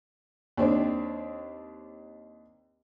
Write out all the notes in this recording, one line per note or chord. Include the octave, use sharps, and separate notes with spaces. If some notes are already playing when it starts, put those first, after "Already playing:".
D#2 C4 D4